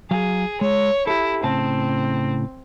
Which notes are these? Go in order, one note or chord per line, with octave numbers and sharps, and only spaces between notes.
F#3 G#4 F5
G#3 C#5
E4 G4 A4
A2 C#3 C4 A5